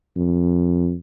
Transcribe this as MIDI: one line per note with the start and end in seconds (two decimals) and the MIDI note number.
0.16 0.94 41